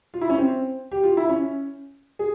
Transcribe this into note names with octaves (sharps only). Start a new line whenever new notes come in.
F4
E4
C#4
C4
G4
F4
E4
C#4
G#4